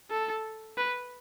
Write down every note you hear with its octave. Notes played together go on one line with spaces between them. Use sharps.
A4
B4